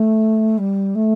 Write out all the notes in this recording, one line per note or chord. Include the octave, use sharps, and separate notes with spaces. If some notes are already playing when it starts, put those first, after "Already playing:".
Already playing: A3
G3
A3